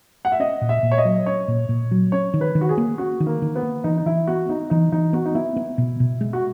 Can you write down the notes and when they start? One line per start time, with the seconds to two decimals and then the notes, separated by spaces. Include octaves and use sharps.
0.25 F#5
0.32 E5
0.40 C#4 D#5
0.61 A#2
0.69 E5
0.83 A#2
0.91 C#5
0.98 D#5
1.05 F#3
1.26 C#4 C#5
1.48 A#2
1.69 A#2
1.91 F#3
2.12 C#4 C#5
2.34 D#3
2.41 B4
2.55 D#3
2.61 F#4
2.69 G#4
2.78 A#3
2.98 C#4 F#4
3.20 D#3
3.27 A#3
3.42 D#3
3.55 B3
3.63 A#3
3.84 E3 D#4
3.97 D#4
4.06 E3 E4
4.27 B3 F#4
4.49 B3 D#4
4.70 E3 D#4
4.92 E3 D#4
5.13 B3 F#4
5.25 D#4
5.35 B3 E4
5.56 B3
5.78 B2
6.00 B2
6.21 G#3
6.33 F#4